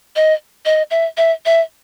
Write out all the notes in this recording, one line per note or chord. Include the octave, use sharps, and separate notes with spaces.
D#5
D#5
E5
E5
E5